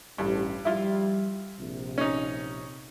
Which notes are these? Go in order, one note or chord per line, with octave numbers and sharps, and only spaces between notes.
A1 G2
F3 G3 E4 F4
A#1 C3
C#4 D#4